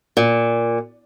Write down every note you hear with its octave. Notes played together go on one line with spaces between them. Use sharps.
A#2